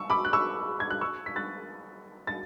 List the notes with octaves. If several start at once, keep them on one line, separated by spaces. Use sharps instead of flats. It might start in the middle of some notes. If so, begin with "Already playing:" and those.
Already playing: C#6 E6
B5 D6
F#6
C#6 E6
G#6
F#6
C#6 E6
B6
F#6 A6
A6